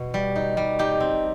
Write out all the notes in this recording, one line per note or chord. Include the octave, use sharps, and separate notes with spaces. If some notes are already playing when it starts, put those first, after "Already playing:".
Already playing: B2
G3
D#4
G3
D#4 G4
C4